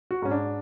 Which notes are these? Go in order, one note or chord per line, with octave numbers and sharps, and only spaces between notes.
F#4
G#2 C#4
D4